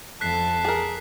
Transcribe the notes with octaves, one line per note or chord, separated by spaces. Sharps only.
F2 A4 A5 F#6 B6 C7
G#4 A#4